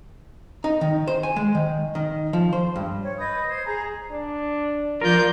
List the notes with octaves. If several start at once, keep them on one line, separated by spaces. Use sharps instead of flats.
D#4
D#3
C5
G#5
G#3
D#3
D#3
F3
C5
G2
C#5
B4 D#5 D#6 G6
C5 G#6
G#4 G#5 A#5
D4
F3 F4 A#4 D5 G6